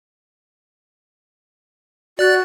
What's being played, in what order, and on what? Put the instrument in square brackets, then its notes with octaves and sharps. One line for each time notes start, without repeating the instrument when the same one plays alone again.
[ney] F#4 [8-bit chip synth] D5 F#6 A6